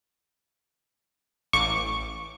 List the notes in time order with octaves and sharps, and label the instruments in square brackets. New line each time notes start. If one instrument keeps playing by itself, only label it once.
[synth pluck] A1 D6 [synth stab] C#6